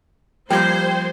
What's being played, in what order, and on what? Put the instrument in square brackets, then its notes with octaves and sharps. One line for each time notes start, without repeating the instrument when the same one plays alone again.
[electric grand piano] F3 G3 [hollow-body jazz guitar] A#3 G4 [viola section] C5 [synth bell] G5 G#6 C7